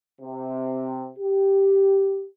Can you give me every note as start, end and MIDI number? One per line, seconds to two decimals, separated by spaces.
0.21 1.10 48
1.19 2.25 67